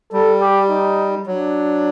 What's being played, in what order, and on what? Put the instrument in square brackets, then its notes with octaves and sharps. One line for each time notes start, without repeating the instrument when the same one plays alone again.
[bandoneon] G3 [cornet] A4
[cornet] G4
D#4
[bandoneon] F#3 [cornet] D4